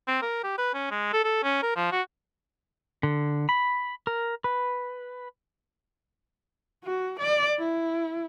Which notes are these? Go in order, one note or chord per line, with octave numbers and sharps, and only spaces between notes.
C4
A#4
G4
B4
C#4
G#3
A4
A4
C#4
A#4
F3
F#4
D3
B5
A#4
B4
F#4
D5
E4